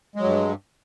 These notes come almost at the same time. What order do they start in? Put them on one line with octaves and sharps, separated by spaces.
G#3 F#3 G2